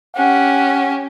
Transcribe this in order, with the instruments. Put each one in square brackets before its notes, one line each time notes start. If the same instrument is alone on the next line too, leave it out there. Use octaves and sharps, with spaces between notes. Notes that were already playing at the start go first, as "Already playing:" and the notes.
[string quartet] C#4 G4 [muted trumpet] F#5